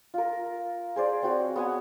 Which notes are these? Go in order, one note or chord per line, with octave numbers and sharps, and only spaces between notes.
F4 A#4
G#4 C5 D5
C4 F#4 C#5
B3 F#5 G#5